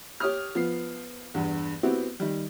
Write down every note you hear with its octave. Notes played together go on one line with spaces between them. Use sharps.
G4 C#5 D#6 F6
F3 B3 C7
E2 G2
B3 C4 E4 F#4 G4
D#3 G3